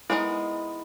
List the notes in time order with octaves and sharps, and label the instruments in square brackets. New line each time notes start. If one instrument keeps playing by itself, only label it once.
[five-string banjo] G#3 B3 D#4 A#4 D#5 [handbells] E4